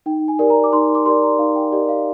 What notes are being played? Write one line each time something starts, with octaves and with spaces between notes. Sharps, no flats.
D#4 G5
G#5
G4 A#4 D5
A#5
D6
D#4 C6
D6
G4 A#4 D5 C6
A#5
D#4 F5
G5
G4 A#4 D5 D#5
F5